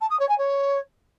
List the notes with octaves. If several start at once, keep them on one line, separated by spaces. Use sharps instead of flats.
A5
D#6
C#5
G#5
C#5